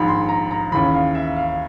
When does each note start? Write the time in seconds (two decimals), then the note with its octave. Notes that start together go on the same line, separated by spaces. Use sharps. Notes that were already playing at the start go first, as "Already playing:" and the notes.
Already playing: A#1 G#2 D#3 B5
0.08 C6
0.29 A#5
0.51 A#5
0.72 D#2 C#3 E3 B5
0.94 F5
1.15 E5
1.36 F5